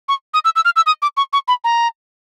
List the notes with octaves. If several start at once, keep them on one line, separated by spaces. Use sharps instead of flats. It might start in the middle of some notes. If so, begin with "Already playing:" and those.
C#6
D#6
E6
E6
F6
E6
D#6
D6
C#6
C#6
B5
A#5